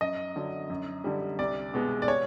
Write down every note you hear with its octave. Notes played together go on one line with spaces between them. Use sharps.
F#2 D#5
D3 F#3
F#2
D3 G3
C2 D5
B2 G#3 B3
D5
C#5